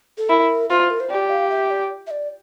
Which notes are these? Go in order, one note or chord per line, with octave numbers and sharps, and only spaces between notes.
A4
E4 A#4
F4 C5
A#4
C5
G4 D5
F5
E5
D5
E5
D5